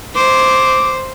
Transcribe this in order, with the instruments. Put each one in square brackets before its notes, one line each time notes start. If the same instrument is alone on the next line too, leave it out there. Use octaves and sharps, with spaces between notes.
[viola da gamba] C5 [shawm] D6